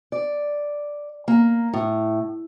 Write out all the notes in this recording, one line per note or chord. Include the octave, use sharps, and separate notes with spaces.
D5
A#3
A2